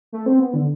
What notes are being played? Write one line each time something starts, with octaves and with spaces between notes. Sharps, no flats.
A3
C4
B3
D3